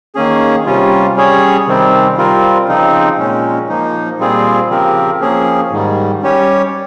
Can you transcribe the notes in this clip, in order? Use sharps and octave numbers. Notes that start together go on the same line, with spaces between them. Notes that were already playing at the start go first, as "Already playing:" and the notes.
D#3 A#3 C#4 G#4
C3 G3 C#4 F4
G3 C#4 G#4 C#5
C3 D#3 G3 C4
G3 C4 F4 A#4
C#3 F3 C4 D#4
A#2 G#3 C#4
F3 A#3 D#4
A#2 G3 C4 F4 G#4
C#3 F3 C4 G4 A#4
F3 A#3 C#4 G#4
G#2 D#3 G3
G3 C#4 G4 C#5